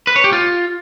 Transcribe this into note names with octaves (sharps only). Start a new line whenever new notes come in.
B4
C#5
G4
F4